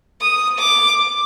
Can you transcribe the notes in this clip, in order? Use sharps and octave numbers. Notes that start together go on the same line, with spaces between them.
D#6
D6